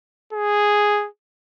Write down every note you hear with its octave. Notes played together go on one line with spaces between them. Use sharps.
G#4